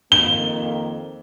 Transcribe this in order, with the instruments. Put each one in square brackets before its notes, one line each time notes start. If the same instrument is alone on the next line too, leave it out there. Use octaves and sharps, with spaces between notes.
[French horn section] F2 D#3 A#3 [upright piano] G7